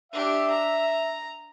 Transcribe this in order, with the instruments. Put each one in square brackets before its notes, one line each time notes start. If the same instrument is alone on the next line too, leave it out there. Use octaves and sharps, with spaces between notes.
[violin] D4 G4 [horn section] E5
[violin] A#5